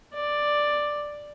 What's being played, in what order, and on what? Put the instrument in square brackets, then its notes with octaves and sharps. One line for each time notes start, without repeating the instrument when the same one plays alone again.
[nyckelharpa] D5